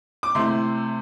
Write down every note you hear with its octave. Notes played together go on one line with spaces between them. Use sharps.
D6
C3 A3 E4 C6